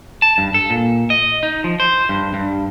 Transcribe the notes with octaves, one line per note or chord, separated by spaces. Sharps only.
A5
G2
A4
A#2
D#5
D#4
F3
C5
G2
G2